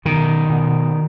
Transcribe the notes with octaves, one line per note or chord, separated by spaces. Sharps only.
B2 D#3
B2